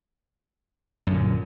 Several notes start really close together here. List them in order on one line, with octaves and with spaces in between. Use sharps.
F#2 D3 A#2